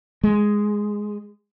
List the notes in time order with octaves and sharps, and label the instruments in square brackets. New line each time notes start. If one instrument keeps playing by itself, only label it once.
[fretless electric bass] G#3